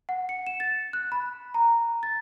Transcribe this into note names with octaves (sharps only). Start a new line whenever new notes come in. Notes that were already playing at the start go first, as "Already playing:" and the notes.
F#5
C#7
E7
A6
F#6
B5
A#5
A6